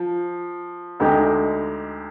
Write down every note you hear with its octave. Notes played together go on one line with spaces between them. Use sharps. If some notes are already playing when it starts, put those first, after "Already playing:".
Already playing: F3
D2 D3 G#3 D#4 G4